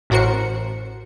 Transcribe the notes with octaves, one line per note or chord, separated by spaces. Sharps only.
A1 A2 F#4 A#4 C5 C#7